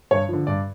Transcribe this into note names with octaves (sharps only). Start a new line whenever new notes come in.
G2 C#5
D3 F3
G2 D5